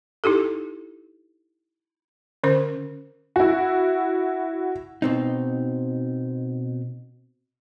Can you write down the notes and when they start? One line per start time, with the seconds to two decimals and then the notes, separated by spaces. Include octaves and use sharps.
0.24 D#4 E4 G4 A4
2.44 D3 C#4 A#4 C5
3.36 E4 F#4
5.02 B2 C4 D#4